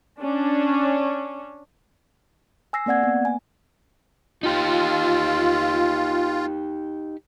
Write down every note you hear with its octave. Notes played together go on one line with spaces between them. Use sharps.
C#4 D4
G#5 E6 A#6 C7
A#3 C4 D5 F#5 G#6
A#3 B3
G#5
D#4 F4 G4